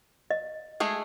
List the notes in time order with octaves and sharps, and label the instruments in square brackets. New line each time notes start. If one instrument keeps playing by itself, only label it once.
[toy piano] D#5
[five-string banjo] G#3 A3 G#4